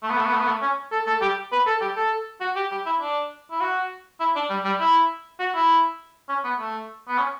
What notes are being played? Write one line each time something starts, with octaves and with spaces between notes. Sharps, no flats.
A3
B3
A3
B3
A3
B3
A3
C#4
A4
A4
G4
B4
A4
G4
A4
F#4
G4
G4
E4
D4
E4
F#4
E4
D4
G3
G3
E4
F#4
E4
C#4
B3
A3
B3
C#4